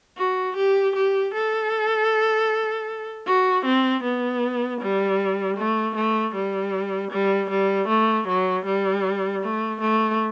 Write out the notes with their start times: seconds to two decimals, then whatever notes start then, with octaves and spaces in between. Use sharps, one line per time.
0.18 F#4
0.56 G4
0.96 G4
1.34 A4
3.27 F#4
3.65 C4
4.03 B3
4.81 G3
5.57 A3
5.95 A3
6.35 G3
7.11 G3
7.50 G3
7.88 A3
8.27 F#3
8.66 G3
9.43 A3
9.81 A3